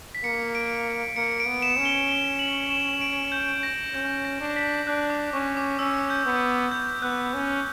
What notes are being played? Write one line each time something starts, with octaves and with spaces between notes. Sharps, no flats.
B6
A#3 C#7
D7
A#3 C#7
D7
B3
E7
C#4
G7
G7
F#7
E7
D7
G6
A#6
C#4 G6
A#6
D4
B6
D4 F#6
D6
C#4 C#6
D6
C#4 E6
G6
B3
G6
B3 F#6
C#4